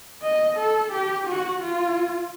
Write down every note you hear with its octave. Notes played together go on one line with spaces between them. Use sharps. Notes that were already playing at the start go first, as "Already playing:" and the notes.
D#5
A4
G4
F#4
F4